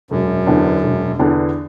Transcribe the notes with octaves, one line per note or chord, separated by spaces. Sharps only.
E1 F#2
E2 D3 B3 D4
E1
E2 D3 B3 D4